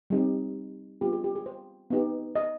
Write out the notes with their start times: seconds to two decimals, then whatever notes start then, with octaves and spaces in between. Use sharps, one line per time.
0.10 G3 C4 D#4 G4 G#4
1.01 G3 B3 D4 F4 G4
1.13 G#4
1.24 G4
1.35 G#4
1.46 C5
1.90 B3 D#4 G4
2.35 D#5